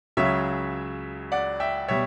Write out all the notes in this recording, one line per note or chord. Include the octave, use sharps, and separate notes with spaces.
C#2 C#3 F#3 C#5 E5
D5 F#5
E5 G5
B2 G3 C#5 E5